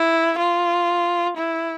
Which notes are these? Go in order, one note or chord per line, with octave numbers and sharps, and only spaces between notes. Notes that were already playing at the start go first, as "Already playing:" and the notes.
Already playing: E4
F4
E4